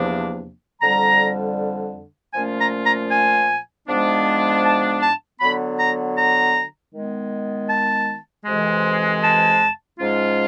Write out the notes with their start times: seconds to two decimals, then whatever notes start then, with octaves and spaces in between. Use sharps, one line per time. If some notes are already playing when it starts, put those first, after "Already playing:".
Already playing: E2 C3 F3 A#3 D4
0.81 F2 D3 G3 A#5
2.34 A#2 F3 A3 C#4 F4 G#5
2.59 A#5
2.85 A#5
3.10 G#5
3.87 G#2 F3 G#3 B3 D4
4.64 A5
5.02 A5
5.40 D3 F#3 B3 B5
5.78 A#5
6.17 A#5
6.92 D#3 G#3 B3
7.69 A5
8.45 F2 C3 E3 G#3
9.23 A5
9.99 G#2 F3 G#3 C#4 F4